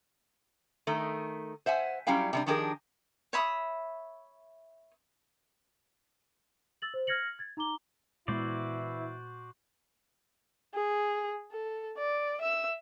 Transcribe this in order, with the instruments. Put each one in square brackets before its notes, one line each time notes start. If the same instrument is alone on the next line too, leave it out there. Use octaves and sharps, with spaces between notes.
[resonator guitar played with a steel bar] D#3 A3
C5 E5 F#5 G#5
F#3 G3 C#4 E4 F5 G5
C3 G3 D4
D#3 F3 D4 G4 G#4 A#4
[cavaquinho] C#5 E5 B5 D#6
[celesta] E6 A6 F#7
C5
F6 G#6 A#6 C#7 F#7
G#6 A6
D#4 A#5 D6 G7
[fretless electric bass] A#2 G#3 B3 [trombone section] E3 E4 [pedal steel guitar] F#4 C5 D5
[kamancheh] G#4
A4
D5
E5 E6